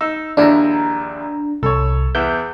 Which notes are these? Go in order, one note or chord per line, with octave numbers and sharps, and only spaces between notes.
D#4 E6
A#1 D#2 D4 E4 A#5
C2 A4 C#5
E2 E4 B4 G6